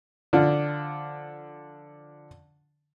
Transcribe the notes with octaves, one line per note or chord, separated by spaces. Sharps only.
D3 F3 D4 F4